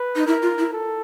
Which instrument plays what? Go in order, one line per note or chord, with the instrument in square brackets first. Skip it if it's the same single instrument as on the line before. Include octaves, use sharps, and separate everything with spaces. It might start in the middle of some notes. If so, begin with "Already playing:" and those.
Already playing: [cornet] B4
[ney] D#4
[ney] E4 [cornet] A#4
[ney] F4
E4
[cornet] A4